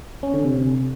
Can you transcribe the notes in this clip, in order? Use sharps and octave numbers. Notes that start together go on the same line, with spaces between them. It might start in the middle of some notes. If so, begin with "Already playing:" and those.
C#4
D3
C3